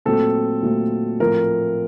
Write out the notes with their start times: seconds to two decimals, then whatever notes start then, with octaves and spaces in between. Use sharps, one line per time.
0.05 A#2 F#3 A3 C4 A4
0.63 A#2 F#3 A3 C4
1.19 A2 F3 A3 C4 A#4